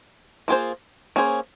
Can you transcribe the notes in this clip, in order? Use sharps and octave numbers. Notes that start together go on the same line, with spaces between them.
A#3 F4 G#4 C5
A#3 C#4 G#4 C5